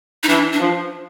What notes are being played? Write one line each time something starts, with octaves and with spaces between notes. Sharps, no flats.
D#4
E3 D4
D4
F3